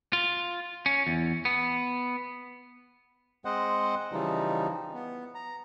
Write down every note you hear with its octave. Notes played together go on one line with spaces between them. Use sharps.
F4
C#4
E2
B3
G#3 C4 C5 D#5 F#5
C#3 E3 F3 G3 D#4
B3
A#5